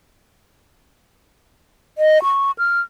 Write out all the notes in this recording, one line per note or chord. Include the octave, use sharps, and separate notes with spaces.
D#5
C#6
F6